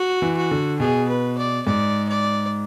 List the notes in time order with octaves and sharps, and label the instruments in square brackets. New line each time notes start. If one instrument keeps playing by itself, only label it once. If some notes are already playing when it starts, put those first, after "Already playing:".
Already playing: [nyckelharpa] F#4
[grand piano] E3
[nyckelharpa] F#4
[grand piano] D3
[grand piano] B2 [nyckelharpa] G#4
[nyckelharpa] B4
D5
[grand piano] G#2 [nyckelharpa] D5
[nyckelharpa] D5